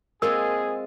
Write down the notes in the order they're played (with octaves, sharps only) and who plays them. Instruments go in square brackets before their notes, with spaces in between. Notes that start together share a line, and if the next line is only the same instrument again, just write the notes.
[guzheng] G#3 C4 F4 [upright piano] A#3 [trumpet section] G#4 [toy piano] A#4 E6